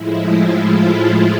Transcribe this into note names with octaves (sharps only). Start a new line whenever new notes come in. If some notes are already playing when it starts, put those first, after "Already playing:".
Already playing: A2 F3 G#3 E4
F4